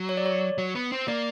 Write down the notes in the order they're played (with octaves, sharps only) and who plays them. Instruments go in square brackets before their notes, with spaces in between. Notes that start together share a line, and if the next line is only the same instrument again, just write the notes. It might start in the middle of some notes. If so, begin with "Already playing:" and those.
Already playing: [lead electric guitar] F#3
[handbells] C#5
D5
C#5
[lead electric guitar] F#3
B3
C4
[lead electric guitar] A#3 [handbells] D5